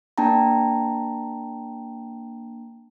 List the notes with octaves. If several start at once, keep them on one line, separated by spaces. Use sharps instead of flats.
A#3 D4 G5 A5 A#5